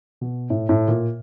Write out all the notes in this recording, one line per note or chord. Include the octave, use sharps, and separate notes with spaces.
B2
A2
A2
A#2